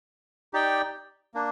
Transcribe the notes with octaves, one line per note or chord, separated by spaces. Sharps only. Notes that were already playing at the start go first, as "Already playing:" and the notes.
D#4 G4 D5 G5
A#3 D4